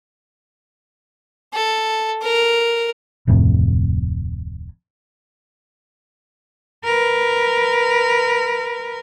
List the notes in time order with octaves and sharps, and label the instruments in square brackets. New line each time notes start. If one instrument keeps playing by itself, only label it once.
[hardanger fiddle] A4
A#4
[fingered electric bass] D1 F2 A2 C3
[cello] A#4 B4